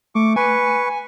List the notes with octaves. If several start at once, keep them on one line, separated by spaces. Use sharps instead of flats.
A3 C#6 D6
B4 G#5 C#6